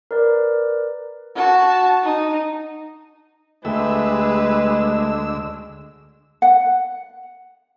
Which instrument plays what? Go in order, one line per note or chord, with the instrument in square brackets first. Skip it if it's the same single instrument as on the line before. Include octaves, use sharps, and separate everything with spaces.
[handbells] A#4 B4 D5
[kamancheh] F#4 A5
D#4
[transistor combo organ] D2 E6 [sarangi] G#3 [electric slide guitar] A3 G4 [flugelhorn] B4
[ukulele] F#5